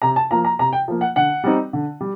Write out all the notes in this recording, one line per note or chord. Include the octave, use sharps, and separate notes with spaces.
C3 A#5
A5
F3 A#3 A#5
A#5
C3 A#5
G5
F3 A#3
F#5
D3 F#5
G3 C4 D#4
D3
G3